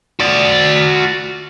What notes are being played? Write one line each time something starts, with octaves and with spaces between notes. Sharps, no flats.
F#4 D5